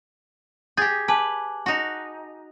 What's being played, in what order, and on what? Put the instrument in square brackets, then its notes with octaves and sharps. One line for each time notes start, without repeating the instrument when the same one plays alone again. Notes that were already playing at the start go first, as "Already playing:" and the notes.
[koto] G4 G#4 [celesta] G6 A6
[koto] B4 [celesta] G#5 A5 D6
[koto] D#4 F#4